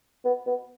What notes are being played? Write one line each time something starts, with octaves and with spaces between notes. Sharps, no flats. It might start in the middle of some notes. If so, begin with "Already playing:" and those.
B3
B3